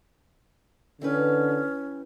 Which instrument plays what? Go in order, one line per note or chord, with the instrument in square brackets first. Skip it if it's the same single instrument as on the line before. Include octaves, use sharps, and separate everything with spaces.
[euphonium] D3 [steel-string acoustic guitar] E3 G4 B4 [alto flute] C#4